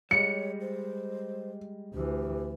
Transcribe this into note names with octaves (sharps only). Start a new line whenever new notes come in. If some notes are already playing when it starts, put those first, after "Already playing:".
G3 G#3 C#5 C#7
C5
D2 E3 G4